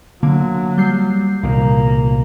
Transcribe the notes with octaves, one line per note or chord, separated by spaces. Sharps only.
D3 F#3 A#3
G3 G6 C7
C2 A#2 D#3 A#3